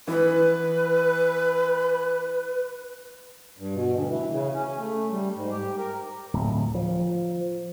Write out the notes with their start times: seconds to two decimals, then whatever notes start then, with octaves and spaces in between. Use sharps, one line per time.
0.08 E3 B4
3.58 G2
3.74 B2
3.92 D2
4.09 E3
4.31 C#3
4.53 C#4
4.78 A3
5.11 G3
5.35 G#2
5.51 G4
5.78 A#4
6.34 D1
6.75 F3